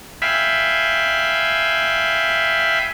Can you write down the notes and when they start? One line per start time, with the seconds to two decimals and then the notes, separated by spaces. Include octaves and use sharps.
0.22 E5 F5 G5 G#5 B5